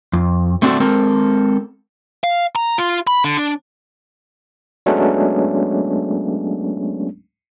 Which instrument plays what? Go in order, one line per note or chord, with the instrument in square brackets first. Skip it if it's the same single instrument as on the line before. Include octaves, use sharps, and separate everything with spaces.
[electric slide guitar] F2
A3 C4 D4 F#4 A4
G#3 C4 A4 A#4
[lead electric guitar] F5
A#5
F4
B5
D3
D4
[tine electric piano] F#3 G#3 A3 B3 C#4 D4